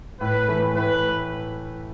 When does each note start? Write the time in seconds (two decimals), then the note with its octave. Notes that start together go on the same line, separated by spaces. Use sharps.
0.21 A2 B4
0.48 E3 A3
0.76 A2 B4